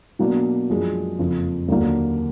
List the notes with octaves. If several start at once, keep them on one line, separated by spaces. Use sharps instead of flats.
B2 F#3 A#3 D4
F#2 F3 G#3 D4 G#4
F#1 F2 F3
D#2 D3 F#3 A#3 D4